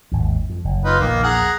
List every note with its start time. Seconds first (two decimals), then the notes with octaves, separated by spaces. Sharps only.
0.12 G#1 D#2
0.50 F2
0.64 F#1
0.84 D#4 F4 B4
1.00 A#1 E2 D#3 A#3
1.24 G#4 F#5 A#5